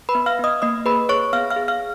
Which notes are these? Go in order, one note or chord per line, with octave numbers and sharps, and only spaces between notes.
B4 B5
B3
F5 F6
B3 D#5 D#6
A#3 D#5 D#6
G#4 B4 B5
G#4 C#5 C#6
B3 F5 F6
F5 F6
G#4
F5 F6